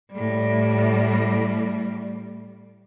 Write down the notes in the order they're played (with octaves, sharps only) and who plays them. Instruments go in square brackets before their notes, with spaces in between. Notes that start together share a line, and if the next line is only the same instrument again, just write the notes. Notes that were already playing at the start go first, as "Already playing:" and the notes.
[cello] A2 G3